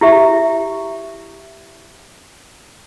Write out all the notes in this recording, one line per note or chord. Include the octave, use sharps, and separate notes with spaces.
E4 G4 E5